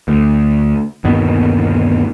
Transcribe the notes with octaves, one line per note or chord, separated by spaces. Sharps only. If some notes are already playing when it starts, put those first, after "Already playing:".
D2
G1 D#2 B2